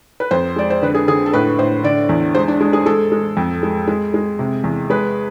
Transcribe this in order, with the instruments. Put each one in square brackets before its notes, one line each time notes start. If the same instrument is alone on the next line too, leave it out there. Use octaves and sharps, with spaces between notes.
[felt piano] B4
F2 C5
G#3 D5
C5
D3 B4
G#4
D3 G#4
A4
A2 B4
A2 C5
D3 D5
E2
G#3 C5
D4
G#3 D4
G#4
G#3 A4
G#3
F2
G#3
G#3
G#3
C3
E2
G#3 B4